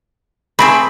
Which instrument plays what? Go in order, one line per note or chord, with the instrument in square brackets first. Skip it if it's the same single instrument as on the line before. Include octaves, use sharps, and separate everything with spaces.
[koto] A3 C4 G#4 [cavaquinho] B5